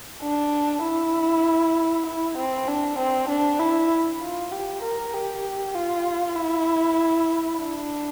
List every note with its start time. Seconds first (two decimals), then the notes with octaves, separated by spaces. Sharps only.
0.22 D4
0.83 E4
2.06 E4
2.37 C4
2.68 D4
2.98 C4
3.29 D4
3.60 E4
4.21 F4
4.52 G4
4.83 A#4
5.14 G4
5.74 F4
6.36 E4
7.59 D4